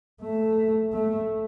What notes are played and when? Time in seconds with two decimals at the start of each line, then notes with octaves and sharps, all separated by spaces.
0.22 A3
0.93 A3